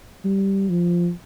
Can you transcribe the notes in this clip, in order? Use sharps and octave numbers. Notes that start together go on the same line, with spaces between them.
G3
F3